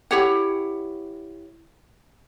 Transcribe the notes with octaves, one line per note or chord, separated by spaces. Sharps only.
E4 G4 C#5 F#5